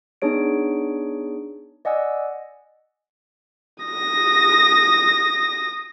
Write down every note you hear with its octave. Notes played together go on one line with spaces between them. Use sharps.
B3 D4 D#4 G#4 C#5 D7
D5 D#5 F#5 G#5 E6
D#6 A#6